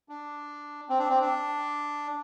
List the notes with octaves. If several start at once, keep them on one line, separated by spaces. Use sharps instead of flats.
D4
C4
D4
C4
D4